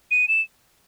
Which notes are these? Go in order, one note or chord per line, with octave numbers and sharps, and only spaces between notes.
D#7
E7